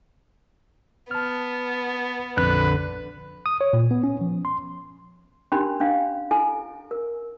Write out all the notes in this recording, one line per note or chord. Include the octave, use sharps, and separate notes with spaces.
B3 A5 F6
A#1 F2 D3 B4 F#6
D#6
C#5
A#2
B3
C#4
F3
C6
C#4 D4 G4 A#4 B5 C6
C#4 D4 F5
E4 A4 G#5
A#4